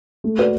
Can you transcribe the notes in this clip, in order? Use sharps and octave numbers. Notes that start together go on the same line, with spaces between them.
A3
F#4 B4 D5